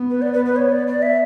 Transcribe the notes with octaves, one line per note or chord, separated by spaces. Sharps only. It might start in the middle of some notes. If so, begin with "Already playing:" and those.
Already playing: B3
B4
D5
B4
B4
C#5
D5
D5
E5